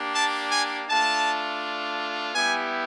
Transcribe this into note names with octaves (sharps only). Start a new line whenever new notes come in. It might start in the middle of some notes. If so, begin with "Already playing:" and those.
Already playing: A#3 D4 G4
A5
G#5
A3 D4 F4 A5
G3 B3 E4 G4 G#5